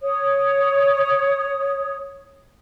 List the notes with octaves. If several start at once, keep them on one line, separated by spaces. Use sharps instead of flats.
C#5 D#6